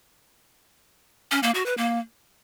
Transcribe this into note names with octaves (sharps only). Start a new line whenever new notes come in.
C#4
A#3
F#4
B4
A#3